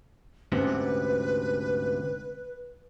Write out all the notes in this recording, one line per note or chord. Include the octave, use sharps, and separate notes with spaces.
D2 G#2 C3 C4 C#4 B4 C5